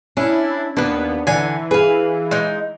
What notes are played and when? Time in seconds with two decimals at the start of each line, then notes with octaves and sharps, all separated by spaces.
0.17 C#4 D4 E4
0.77 D#2 A#3 B3 D4 B4
1.27 D3 E3 G#5
1.71 G#4 B4 F5
2.31 G#3 D#4